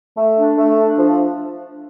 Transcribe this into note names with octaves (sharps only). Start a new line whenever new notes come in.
A3
D4
A3
D4
F3